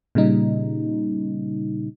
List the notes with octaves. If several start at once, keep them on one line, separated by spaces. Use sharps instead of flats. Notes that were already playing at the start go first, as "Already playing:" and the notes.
A#2 C#3 G3 D#4